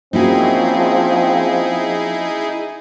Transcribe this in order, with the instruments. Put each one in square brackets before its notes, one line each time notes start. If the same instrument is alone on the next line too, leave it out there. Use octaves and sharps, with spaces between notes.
[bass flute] F3 [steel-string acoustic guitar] A#3 C#4 F#4 [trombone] C4 [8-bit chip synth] D#4 E4 G#4